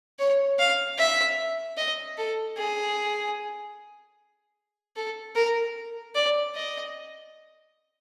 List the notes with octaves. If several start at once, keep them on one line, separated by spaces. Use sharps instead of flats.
C#5
F5
E5
D#5
A4
G#4
A4
A#4
D5
D#5